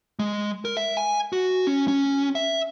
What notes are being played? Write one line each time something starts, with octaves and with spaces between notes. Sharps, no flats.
G#3
A#4
E5
G#5
F#4
C#4
C#4
E5